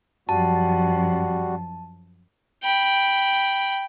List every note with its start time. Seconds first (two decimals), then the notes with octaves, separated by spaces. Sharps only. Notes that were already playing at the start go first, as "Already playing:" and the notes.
0.29 F#2 F3 G3 F#4 A5
2.63 G5 B5